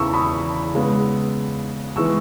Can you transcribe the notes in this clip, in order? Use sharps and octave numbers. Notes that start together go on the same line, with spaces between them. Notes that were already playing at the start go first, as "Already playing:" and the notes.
Already playing: E2 C#3 E3 A#5 B5 C#6 E6
B5 D#6
C#3 G#3 B3
E3 G#3 B3 C#6 E6